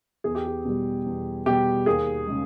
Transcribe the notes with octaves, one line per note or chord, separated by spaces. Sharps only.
E2 G#4
G4
G#4
B2 G3
E2
B2 G3 G4
D#2 G#4
C#3 G#3